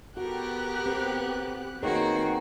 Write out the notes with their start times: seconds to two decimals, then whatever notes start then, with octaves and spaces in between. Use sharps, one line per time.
0.17 B3 F#4 G4 A4 A#4 F#6
0.86 C4
1.83 D#3 A#3 C4 F#4 G#4 B4 C#5